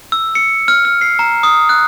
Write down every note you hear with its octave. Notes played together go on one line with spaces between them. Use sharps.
E6
C#7
F6
F6
C7
A#5
D#6
F#6